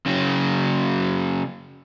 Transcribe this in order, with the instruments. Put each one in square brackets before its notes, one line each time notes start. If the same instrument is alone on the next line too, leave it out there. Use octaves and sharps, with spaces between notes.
[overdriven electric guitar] C#3 F#3